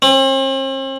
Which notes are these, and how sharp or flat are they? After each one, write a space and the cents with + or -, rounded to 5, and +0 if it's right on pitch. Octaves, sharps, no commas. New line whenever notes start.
C4 +45